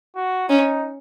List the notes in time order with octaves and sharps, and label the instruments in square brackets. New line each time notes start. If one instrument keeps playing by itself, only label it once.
[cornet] F#4
[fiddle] C#4 [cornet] D#4